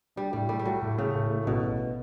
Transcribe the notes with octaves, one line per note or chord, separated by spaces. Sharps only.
G3 D4
A2 G3
G3 A3
G3
F#3 A3
A2
C#3 A3
A2
A3
A1 B2
A1